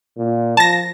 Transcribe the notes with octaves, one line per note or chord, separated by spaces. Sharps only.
A#2
F3 A5 A#6